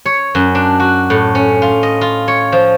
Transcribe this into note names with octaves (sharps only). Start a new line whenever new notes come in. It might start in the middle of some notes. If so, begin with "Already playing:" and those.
C#5
F#2
D4
F#4
A2
C#4
F4
D#5
F4
C#5
F3